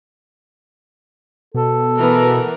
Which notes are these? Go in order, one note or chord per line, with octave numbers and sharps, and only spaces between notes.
B2 A4
E3 B3 A#4